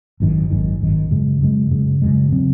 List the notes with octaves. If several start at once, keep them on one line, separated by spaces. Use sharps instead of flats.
G#1 F#2 D#3
G#1 F#2 D#3
G#1 F#2 D#3
F#2 C#3 G#3
F#2 C#3 G#3
F#2 C#3 G#3
F#2 C#3 G#3
C#3 F#3 C4